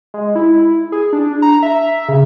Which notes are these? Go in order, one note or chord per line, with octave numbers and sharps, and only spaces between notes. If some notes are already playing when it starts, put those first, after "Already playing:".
G#3
E4
G#4
D4
A#5
E5
C#3